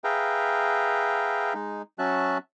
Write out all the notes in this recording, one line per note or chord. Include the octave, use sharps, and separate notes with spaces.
G#4 B4 E5 F5 G5 A#5
G#3 D#4
F#3 C#4 F#4 E5 A5 F#6